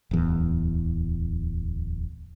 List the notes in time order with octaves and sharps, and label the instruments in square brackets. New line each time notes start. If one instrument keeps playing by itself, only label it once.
[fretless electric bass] D1 E2